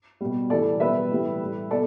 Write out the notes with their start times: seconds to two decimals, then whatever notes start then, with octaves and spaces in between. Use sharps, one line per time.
0.21 B2 G3
0.50 A2 E3 G3 A4 D5
0.80 B2 G3 B4 E5
1.10 A2 E3 G3
1.41 A2 G3
1.71 B2 A4 D5